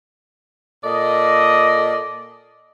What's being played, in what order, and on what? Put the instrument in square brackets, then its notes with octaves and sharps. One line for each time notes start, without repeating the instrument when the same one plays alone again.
[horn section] A#2 A4 D5 D#5